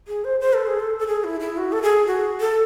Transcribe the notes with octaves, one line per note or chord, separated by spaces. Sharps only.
G#4
C5
C5
A4
G#4
A4
A4
G#4
E4
E4
F#4
A4
G#4
F#4
A4